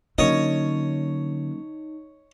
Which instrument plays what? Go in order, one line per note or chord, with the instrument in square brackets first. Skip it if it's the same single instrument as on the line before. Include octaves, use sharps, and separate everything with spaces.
[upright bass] D3 [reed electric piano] F#3 A#3 C#4 [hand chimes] D#4 [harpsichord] C#5 D#5